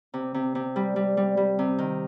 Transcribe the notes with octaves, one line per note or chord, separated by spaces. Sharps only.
C3
C3
C3
G3
G3
G3
G3
C3
D#3